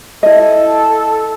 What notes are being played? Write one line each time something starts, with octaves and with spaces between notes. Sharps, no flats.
E4 A4 D#5